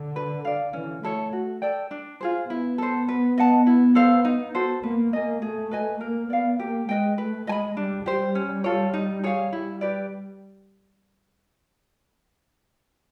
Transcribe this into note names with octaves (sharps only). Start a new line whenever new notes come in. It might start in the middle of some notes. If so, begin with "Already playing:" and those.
Already playing: D3
B4
D5 F5
E3 C#4
A3 E4 A4 C#5
F#4
A4 D5 G5
D4
F4 G#4 C5
B3 E4
A4 C5
B4
D#5 F#5 A5
E4
A4 C5 F5
D#4
F#4 A4 C5
A#3 B4
A#3 D#5 G#5
A3 G#4
B4 D#5 G#5
A#3 A#4
B3 D5 F5
A#3 G4
G#3 B4 D#5 G5
A3 B4
G#3 D#5 G#5 B5
G3 D4
G3 G4 C5
C#4
F4 A4 C#5
D#4
G#4 C#5 F5
G3 E4
G4 B4 D5